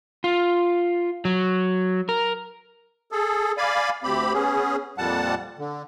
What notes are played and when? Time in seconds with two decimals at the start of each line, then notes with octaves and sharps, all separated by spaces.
0.24 F4
1.25 F#3
2.09 A#4
3.12 G#4 A4
3.58 D5 F5 G#5 B5
4.03 D2 C4 G4 B5
4.33 B3 C#4 G#4
4.98 F2 A#2 G3 F#5 A5
5.59 D3